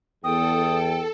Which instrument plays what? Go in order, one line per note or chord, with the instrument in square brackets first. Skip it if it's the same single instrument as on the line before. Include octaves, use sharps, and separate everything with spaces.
[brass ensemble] E2 [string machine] A4 [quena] G5 [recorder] D#6